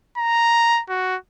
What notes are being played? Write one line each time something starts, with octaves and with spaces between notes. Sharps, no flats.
A#5
F#4